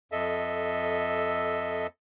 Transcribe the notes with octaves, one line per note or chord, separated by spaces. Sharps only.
F2 A4 D#5 E5